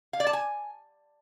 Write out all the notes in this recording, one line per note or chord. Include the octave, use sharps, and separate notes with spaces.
F5
D5
A5
G#5